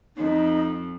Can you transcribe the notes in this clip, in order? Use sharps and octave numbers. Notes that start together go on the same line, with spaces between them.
F2 D#4